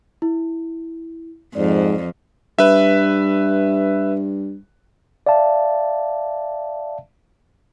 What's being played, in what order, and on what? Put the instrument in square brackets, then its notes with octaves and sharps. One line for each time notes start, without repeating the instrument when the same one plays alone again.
[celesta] E4
[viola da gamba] F2 [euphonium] G#2 [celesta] D5
[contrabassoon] G2 [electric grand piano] B4 E5
[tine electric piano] D5 E5 F5 A5